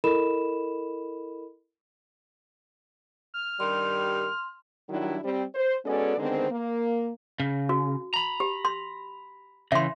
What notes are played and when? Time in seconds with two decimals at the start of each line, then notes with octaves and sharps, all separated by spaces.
0.04 E4 A4 A#4 D#5 B5 E7
3.34 F6
3.60 G2 D#3 G3 C6
4.89 D#3 F#3 G3 D4 E4
5.24 G3 C4
5.55 C5
5.85 G#3 B3 C#4 F#4 A4 D5
6.18 D3 D#3 G#3 B3 C4
6.51 A#3
7.40 C#3
7.69 F#4
8.14 A#5 B5
8.40 G4
8.65 C6
9.72 C#3 E3 E5 C6